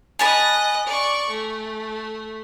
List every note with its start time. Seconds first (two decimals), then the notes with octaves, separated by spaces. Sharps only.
0.19 D#5 G#5 A5 B5 F#6
0.87 D5 C#6
1.29 A3